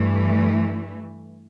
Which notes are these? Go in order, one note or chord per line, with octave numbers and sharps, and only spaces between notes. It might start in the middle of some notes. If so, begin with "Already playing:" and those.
Already playing: G2 E3 A3